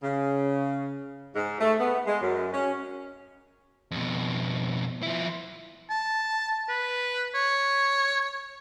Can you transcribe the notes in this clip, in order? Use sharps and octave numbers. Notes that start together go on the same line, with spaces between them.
C#3
G#2
A3
B3
G#3
F#2
C#4
F2 B2
F3 E4
A5
B4
C#5